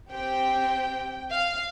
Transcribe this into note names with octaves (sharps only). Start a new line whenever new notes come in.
C4 G4 G5
F5